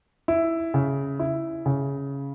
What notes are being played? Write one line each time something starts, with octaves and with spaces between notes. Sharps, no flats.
E4
C#3
E4
C#3